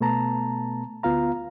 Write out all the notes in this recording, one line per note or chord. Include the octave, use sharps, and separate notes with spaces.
B2 A3 B3 A5 A#5
D2 B3 F4 F5 A#5